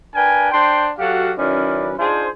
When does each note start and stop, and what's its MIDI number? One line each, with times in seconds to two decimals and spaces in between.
0.15 0.48 62
0.15 0.48 70
0.15 0.48 71
0.15 0.48 79
0.15 0.48 80
0.52 0.88 62
0.52 0.88 72
0.52 0.88 79
0.52 0.88 84
0.98 1.32 54
0.98 1.32 66
0.98 1.32 67
0.98 1.32 69
0.98 1.32 77
1.37 1.93 42
1.37 1.93 51
1.37 1.93 61
1.37 1.93 64
1.37 1.93 71
1.37 1.93 74
1.98 2.27 62
1.98 2.27 63
1.98 2.27 65
1.98 2.27 68
1.98 2.27 72